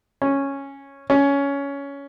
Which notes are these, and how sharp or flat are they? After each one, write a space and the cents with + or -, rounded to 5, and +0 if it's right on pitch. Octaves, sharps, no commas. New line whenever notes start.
C#4 -5
C#4 +15